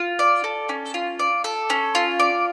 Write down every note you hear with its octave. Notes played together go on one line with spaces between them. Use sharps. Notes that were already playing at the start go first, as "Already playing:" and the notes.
Already playing: F4
D5
A4
C#4
F4
D5
A4
C#4
F4
D5